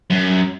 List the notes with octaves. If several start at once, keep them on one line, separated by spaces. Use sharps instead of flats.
F#2